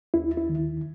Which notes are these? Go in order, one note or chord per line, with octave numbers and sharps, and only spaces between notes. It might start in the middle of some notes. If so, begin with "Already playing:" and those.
D#2 E4
E4
D#3